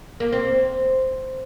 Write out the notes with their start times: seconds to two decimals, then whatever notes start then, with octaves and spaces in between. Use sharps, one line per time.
0.20 A#3
0.32 C4